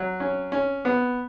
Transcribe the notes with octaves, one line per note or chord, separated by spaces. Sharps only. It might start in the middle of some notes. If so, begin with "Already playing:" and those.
Already playing: F#3
C#4
C#4
B3